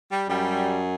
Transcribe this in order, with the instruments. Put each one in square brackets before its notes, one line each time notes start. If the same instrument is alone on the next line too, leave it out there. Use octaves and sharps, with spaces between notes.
[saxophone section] G3
[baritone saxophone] F#2 [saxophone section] G3